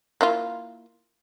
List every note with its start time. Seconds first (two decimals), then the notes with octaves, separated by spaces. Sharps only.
0.21 A#3 E4 F4